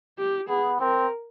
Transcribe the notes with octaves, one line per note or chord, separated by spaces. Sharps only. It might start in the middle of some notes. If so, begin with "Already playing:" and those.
G4
B3 G#4
C4 A#4